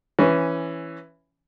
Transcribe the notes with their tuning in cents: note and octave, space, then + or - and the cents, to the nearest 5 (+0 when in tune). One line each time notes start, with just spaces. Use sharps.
E3 +5 C#4 +0